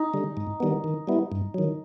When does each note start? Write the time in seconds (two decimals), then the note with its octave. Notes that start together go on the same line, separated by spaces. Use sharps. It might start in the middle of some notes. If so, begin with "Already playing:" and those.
Already playing: D#4
0.14 D3 G3
0.37 G#2
0.60 D#3 G3 B3
0.84 D#3
1.07 G3 B3 E4
1.32 G2
1.54 D#3 F#3